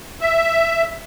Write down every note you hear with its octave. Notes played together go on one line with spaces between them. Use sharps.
E5